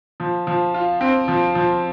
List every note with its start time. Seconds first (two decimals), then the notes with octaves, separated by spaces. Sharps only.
0.20 F3
0.47 F3
0.74 F4
1.01 C4
1.28 F3
1.55 F3